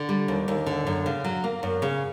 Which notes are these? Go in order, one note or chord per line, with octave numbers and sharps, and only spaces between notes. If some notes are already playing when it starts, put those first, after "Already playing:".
Already playing: D3
G3
D#2
D#2
D3
F#2
C#3
F#3
A#3
F#2
C#3